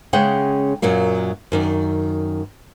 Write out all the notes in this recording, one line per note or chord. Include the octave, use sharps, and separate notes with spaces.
C#3 G#3 C#4 F#5 G5
F#2 A#2 F#3 A#3
F#2 D#3 D5